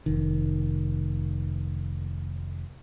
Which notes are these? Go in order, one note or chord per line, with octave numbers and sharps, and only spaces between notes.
F1 D#3